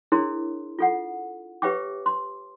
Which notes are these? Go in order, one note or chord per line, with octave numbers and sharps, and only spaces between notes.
D4 E4 G#4 A#4 C#5 C6
F4 A4 F#5
G4 B4 C#5 E5 G5 D6
C6